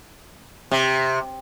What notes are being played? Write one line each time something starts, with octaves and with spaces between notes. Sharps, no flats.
C3